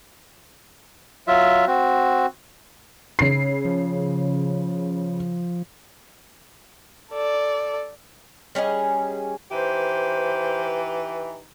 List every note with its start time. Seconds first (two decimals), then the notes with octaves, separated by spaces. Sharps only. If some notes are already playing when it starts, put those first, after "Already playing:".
1.28 F#3 F4 E5
1.67 C4 F#4
3.19 C#3 C7
3.65 F3
7.12 A4 D5
8.55 G3 C#4 G#4 D#5
9.52 E3 D#4 G4 B4 C5